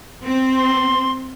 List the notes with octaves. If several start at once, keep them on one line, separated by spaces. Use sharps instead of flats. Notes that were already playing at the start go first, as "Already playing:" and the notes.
C4
C6